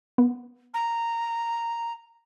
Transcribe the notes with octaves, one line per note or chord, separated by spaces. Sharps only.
B3
A#5